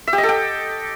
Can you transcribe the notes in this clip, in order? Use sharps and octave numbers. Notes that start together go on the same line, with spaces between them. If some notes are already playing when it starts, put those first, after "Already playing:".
E5
G4
D#5
A4
G5